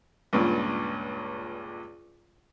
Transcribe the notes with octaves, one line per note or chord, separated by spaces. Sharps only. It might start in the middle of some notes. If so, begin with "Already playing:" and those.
C#2 G2 A#2